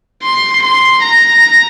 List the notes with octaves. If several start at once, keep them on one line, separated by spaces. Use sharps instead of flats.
C6
C6
A#5